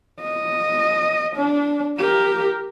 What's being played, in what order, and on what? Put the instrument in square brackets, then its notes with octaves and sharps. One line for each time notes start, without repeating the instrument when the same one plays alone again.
[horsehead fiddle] D#5
D4
G4 A#4